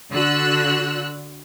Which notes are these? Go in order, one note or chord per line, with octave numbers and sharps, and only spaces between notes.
D3 F#4 E6 F#6